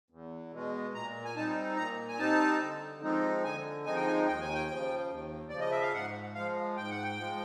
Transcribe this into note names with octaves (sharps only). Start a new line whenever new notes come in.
E2
B2 G#3
A#2 A#5
G#5
G3 C4 D#4 A5
A#2 A#5
G#5
G3 C4 D#4 A5
D3
F3 G#3 C4 D#4
D3 G#5
F3 G#3 C4 D#4 G#5
G5
G#5
D#2 G5
G#5
G5
C#3 F3
D#2
C#3 F3 D5
D#5
E5
F5
G#2 F#5
F3 G#3 F5
G#2 G5
F#5
G5
F3 G#3